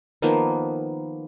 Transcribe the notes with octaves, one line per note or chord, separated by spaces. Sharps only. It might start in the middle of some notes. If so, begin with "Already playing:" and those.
D#3 F3 A#3 B3